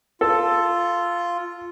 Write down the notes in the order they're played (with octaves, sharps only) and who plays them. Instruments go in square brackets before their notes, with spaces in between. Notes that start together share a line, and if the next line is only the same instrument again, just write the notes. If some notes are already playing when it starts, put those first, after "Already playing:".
[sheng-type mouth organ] F4 [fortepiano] A4